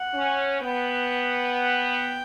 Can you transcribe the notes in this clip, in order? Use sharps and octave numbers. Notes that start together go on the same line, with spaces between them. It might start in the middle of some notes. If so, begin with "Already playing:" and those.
Already playing: F#5
C#4
B3 G5